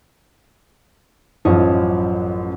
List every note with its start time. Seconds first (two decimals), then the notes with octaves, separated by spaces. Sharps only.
1.45 A1 F#2 F3 C#5 D#5